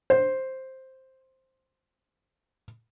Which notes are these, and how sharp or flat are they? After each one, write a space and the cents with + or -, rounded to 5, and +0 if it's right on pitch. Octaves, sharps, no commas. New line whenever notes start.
C5 +5